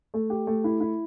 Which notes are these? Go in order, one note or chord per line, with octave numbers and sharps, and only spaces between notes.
A3
G4
A3
E4
E4